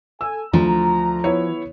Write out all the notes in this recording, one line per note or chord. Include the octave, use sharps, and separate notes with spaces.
A4 G#5 E6
D2 F3 A#5
B3 E4 C#5